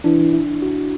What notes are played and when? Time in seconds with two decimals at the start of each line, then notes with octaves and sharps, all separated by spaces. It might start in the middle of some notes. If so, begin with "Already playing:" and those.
0.04 E3 D4
0.34 E4
0.62 F#4